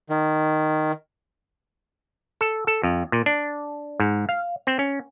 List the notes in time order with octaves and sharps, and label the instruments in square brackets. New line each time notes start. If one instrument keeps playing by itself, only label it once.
[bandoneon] D#3
[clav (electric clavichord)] A4
A4
F2
A#2
D4
G#2
F5
C4
C#4